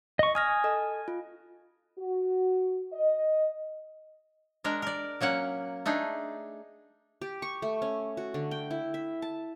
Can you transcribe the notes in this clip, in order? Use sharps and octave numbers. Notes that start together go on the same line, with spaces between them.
D#5 C#6
G#5 D#6 F6 A#6
A4 D#5
F4
F#4
D#5
G#3 D4 A#4 A#5
A#4 D5
F#3 A#3 C#4 F#5
A3 D4 D#4 G#4
G4
C#6
A3
C#4
F#4
D3
G5
E4
E5
A5